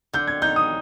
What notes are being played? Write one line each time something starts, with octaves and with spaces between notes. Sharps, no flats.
D3 G6
G#6
D#4 G6
D#6